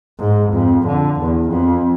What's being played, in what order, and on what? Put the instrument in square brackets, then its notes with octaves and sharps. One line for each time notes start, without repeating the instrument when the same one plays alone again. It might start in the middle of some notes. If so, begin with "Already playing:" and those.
[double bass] G#2
F2
D3
E2
F2